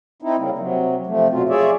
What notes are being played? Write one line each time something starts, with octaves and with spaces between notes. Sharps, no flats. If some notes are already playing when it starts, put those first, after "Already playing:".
C4 D#4 E4
C#3 G3 A#3
C3 F#3
C3 F3 A3
F#2 B2 F#3 C4 F4
F4 G#4 C#5 D5 E5